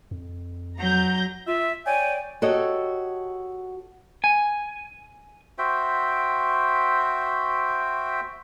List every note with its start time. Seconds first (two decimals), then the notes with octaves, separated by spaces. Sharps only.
0.11 F2
0.78 F#3 A#5 G6
1.47 F4 E5
1.86 C#5 D5 G5 G#5
2.42 F#4 G4 A4 C#5 D#5
4.24 G#5
5.58 F#4 C5 E5 G5